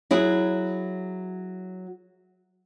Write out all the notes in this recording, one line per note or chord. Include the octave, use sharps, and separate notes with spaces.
F#3 E4 G#4